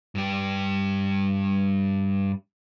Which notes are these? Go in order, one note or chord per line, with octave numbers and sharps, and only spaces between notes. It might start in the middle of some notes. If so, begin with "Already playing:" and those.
G2 G4